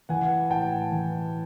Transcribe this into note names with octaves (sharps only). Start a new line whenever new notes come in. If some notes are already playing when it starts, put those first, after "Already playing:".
E3 F#5 G#5
A2 G5 A5
E3